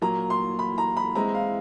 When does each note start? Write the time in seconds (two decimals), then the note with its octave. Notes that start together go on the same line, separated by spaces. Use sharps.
0.01 A#2 F#3 A#3 A#5
0.30 C6
0.59 B5
0.78 A#5
0.97 B5
1.15 E3 G#3 C4 E4 A#5
1.35 F5